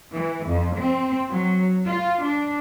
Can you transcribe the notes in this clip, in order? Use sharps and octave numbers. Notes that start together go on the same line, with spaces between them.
E3
F2
C4
F#3
F4
D4